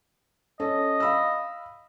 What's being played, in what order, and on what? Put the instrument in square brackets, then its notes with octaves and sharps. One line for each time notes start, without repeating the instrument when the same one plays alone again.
[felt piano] C#4 A4 [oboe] D#5
[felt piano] F5 B5 E6